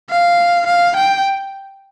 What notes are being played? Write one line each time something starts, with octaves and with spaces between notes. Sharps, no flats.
F5
F5
G5